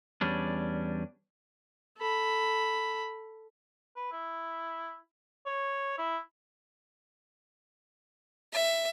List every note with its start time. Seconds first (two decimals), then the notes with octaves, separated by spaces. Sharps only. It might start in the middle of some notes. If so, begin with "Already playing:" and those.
0.21 E2 G3 C#4 D4
1.98 A4 B5
3.96 B4
4.12 E4
5.46 C#5
5.98 E4
8.53 E5